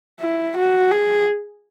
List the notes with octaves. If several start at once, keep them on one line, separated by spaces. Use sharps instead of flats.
E4
F#4
G#4